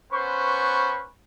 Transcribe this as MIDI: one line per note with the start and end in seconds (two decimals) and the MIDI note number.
0.13 1.05 59
0.13 1.05 61
0.13 1.05 71
0.13 1.05 72
0.13 1.05 85